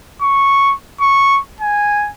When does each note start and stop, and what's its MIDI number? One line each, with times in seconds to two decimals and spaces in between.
0.22 0.75 85
1.01 1.40 85
1.61 2.10 80